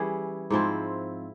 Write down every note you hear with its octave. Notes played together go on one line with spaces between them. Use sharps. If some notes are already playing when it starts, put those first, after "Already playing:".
Already playing: E3 G3 C#4 E4 G#4
G#2 F3 C4 E4